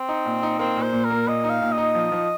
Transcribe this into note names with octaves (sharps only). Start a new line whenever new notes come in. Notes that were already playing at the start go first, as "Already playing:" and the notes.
Already playing: C4
D#4
A#2
D#4
A#3 C4
A#2
C5
A#2
A#4
A#3
A#2 D#5
D#4
F5
A#2
D#5
D#4
F3
F3